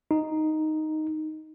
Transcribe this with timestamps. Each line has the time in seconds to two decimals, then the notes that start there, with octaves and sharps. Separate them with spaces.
0.11 D#4